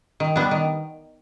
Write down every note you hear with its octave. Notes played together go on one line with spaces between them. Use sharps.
D#3
G3 B3 D4
D#3